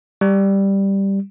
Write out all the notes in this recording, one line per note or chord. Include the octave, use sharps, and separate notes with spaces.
G3